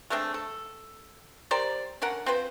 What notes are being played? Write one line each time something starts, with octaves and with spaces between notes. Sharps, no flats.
G#3 A3 C4 D4
A4
G4 A#4 C5 D5
D3 C#4 A#4 F#5
C4 F4 B4 C5